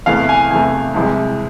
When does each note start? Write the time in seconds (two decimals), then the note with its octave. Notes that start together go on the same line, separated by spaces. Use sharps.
0.06 E2 C3 E3 A3 F5
0.29 G#5
0.51 E2 C3 E3 A3 G#5
0.94 C2 C3 E3 G#3